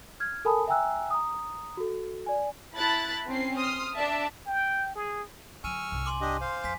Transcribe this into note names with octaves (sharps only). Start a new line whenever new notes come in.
F6 G#6
A4 A#4 G#5 A5 B5 D#6
E5 G5 G#5 A#5 E6 F#6
A#5 D#6
F#4 A4
D5 G#5
E4 A5 B5 F#6 A6
C4 C#4 C7
C6 D#6 F6
D4 D5 E5 A5
G5
G#4
D3 F#3 G#5 C#6 E6 F6 D#7
C2 G2
G#5 C6 D6
D4 G4 D#5
C5 F5
F2 G#5 B6